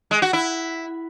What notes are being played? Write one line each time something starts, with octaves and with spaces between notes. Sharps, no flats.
G#3
F#4
E4